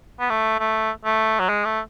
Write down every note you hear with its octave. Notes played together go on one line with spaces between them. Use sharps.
B3
A3
A3
A3
F#3
G#3
A3